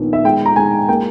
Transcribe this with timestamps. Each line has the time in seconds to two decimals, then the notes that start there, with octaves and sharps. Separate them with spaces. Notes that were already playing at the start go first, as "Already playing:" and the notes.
Already playing: A#1 D#3 B3
0.13 E5
0.24 G#3 G5
0.45 A#5
0.56 G#3 G#5
0.88 A#3 G5